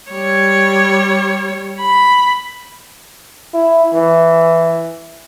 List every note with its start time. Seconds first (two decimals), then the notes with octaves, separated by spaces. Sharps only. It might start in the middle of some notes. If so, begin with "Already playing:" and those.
0.12 G3 C#5
1.79 B5
3.54 E4
3.94 E3